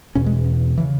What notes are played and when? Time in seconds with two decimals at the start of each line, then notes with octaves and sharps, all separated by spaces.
0.15 E2 B2 C#4
0.26 G#3
0.78 C#3 E3